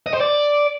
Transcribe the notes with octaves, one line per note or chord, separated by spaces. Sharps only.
D#5
C5
D5